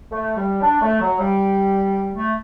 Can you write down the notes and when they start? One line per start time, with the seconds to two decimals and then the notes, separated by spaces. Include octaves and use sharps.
0.12 A3
0.37 G3
0.62 D4
0.82 A3
1.01 F#3
1.19 G3
2.14 A3